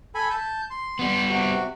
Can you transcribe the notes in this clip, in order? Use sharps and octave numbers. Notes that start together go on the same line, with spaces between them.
A4 G#5 B5
A5 G6
C6
G3 B3
C3 F#4